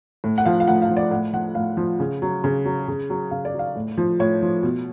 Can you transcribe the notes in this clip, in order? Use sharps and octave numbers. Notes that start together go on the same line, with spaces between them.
A2
F#5
F3 F5
F5
A2 F#5
F5
F3
D5
A2 F#5
F3 F#5
A2 F5
F3
C#3
F#3
C#3
F#3
C#3
F#3
C#3 F5
D5
F#3
F5
A2
F3
A2 C#5
F3
B2